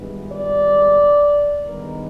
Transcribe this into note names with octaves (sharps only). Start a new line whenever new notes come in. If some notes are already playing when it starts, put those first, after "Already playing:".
Already playing: G#1 G2 E3 G#3 B3
D5
G2 D#3 G#3 B3 D#4 A#4